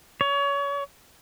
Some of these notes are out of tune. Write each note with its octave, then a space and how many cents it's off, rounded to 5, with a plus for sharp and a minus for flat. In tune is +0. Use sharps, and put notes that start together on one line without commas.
C#5 +30